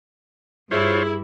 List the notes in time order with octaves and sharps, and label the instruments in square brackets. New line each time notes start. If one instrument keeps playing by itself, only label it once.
[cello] G2 [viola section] E4 [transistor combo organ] F4 C5 C#5 [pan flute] G#4